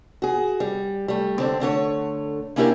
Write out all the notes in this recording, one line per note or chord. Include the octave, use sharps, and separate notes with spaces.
F#4 G#4
G3
G3 A3
D3 C4 D4
D3 A3 C#5
A#3 C#4 D4 E4 G4 A#4